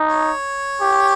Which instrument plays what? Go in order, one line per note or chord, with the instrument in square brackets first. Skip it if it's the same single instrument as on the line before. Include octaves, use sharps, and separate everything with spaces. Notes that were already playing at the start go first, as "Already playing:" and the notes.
Already playing: [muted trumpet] D#4
[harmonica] C#5
[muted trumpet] G4